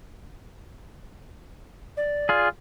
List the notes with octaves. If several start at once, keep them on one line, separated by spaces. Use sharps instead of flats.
D5
F4 G#4